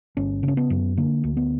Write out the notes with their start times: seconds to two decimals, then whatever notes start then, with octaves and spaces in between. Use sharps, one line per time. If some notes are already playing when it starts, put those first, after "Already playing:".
0.17 G1 C#4
0.43 C#3
0.48 C#4
0.57 B3
0.70 F#2
0.97 D3 A#3
1.24 D2
1.37 B3